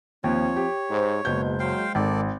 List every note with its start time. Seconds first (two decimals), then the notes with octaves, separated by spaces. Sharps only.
0.24 D#2 F3 C4 C#5
0.56 G4
0.90 G#2 C5
1.25 F#1 B2 G#3 G6
1.60 F#3 C5 F5 G5
1.95 G#1 D#3 A4 D5